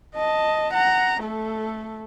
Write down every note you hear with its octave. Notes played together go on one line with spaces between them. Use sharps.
D#5 A5
F#5 A#5
A3 A4